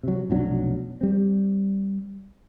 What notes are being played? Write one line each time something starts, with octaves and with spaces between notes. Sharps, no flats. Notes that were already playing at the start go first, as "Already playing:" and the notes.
C3 F#3
F1 B1 F#3 D4
G3 C4